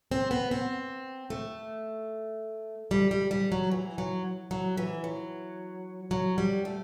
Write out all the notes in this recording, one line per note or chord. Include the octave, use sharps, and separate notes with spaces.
C4
B3
C4
A3
G3
G3
G3
F#3
E3
F#3
F#3
E3
F#3
F#3
G3
A3